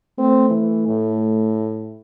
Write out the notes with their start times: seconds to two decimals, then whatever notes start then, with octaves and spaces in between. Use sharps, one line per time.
0.18 A3 C4
0.50 E3
0.87 A2